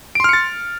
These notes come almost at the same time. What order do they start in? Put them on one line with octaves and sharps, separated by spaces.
D7 C6 F6 C#7 A6